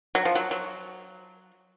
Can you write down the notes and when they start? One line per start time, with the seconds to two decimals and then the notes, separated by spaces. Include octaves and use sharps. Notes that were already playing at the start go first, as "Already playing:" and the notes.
0.15 F#3
0.25 F3
0.35 F#3
0.51 F#3